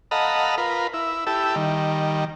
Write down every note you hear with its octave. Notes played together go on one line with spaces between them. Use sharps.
A4 D#5 F5 F#5 A#5 B5
F4 A#4 B4
E4
E4 G4 A4
D#3 G3